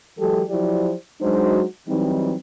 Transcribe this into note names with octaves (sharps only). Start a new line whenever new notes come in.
E3 F#3 G#3 G4 A4
F3 F#3 E4 G4 C5 D5
F#3 G#3 D4 D#4 F#4 C5
E3 F#3 G3 C4 D#4